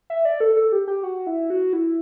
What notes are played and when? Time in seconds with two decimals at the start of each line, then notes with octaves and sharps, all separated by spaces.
0.10 E5
0.25 D5
0.40 A4
0.56 A4
0.72 G4
0.87 G4
1.03 F#4
1.27 E4
1.50 F#4
1.73 E4